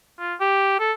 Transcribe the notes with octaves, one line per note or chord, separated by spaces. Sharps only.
F4
G4
A4